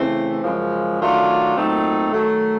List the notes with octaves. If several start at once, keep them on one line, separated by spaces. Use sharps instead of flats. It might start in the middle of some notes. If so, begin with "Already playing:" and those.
Already playing: C#3 E3 A3 C4 E4
F#2 C#3 F3 G#3
D#3 F#3 A3 D4 F4
A#2 F#3 A3 C4 D#4
D#3 F#3 A3